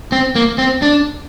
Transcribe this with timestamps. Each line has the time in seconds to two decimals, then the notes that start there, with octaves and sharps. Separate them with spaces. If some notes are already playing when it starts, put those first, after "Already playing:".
0.12 C4
0.36 A#3
0.58 C4
0.82 D4